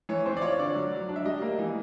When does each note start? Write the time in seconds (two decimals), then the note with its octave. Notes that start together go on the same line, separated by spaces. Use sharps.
0.09 E3 C#5
0.26 C4 C5
0.37 D5
0.42 F4 C#5
0.58 D3 D5
0.75 F#3
0.92 F#3
1.09 D4
1.16 E5
1.25 G3 D#5
1.42 A#3
1.59 E3